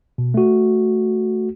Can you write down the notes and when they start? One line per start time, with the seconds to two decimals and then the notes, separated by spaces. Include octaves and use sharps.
0.18 B2
0.34 A3 F#4